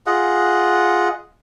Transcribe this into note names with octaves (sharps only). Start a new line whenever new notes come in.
F4 G#4 D#5 F#5